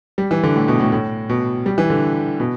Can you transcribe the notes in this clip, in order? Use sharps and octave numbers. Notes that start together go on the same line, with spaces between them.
G3
E3
D3
A2
B2
A2
A2
B2
G3
E3
D3
B2